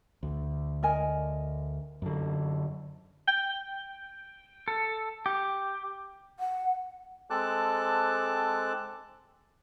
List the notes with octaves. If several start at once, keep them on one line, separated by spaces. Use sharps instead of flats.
D2
A#4 D#5 G#5
F#2 D3
G5
A4
G4
F#5
G#3 C4 A4 A5 D6 F#6